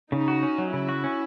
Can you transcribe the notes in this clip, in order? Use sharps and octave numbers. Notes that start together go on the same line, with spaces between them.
C#3 D#4
F#4
C#4
F#3
C#3 E4
F#4
C#4